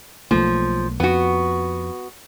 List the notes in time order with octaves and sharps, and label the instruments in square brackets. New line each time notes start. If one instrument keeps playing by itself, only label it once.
[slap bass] B1 A3 A#3 [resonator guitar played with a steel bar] F3
[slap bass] F2 [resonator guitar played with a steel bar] B3 F#4